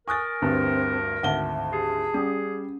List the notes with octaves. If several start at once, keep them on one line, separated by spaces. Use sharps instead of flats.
A#4 G#5 C#6 D#6 F#6 A6
D2 G2 C4
G#1 D2 E5 F#5 A5 G7
G4 G#4
G3 C#4